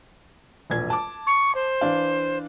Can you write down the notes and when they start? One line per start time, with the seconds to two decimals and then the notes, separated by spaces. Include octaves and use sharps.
0.70 E1 A#1 G#6
0.90 A5 D6
1.27 C#6
1.55 C5
1.81 E3 D4 F5